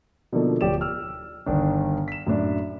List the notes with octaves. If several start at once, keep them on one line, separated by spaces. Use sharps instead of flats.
B2 D3 F3 A#3 D#4 A4
D1 F3 G4 C#5 D5 E7
E6 F6
G1 D#3 D4
B6 E7
F#2 A2 D4